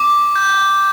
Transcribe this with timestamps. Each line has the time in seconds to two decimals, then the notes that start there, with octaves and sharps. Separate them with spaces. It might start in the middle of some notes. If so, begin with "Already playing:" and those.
Already playing: D6
0.36 G6